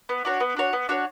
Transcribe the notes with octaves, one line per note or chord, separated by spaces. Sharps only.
B3
D4 F#4 C#5
B3
D4 F#4 C#5
B3
D4 F#4 C#5